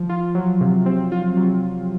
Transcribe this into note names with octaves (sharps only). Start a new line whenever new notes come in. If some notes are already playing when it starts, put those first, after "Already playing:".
Already playing: F3
F4
F#3
C3
C4
F4
F#3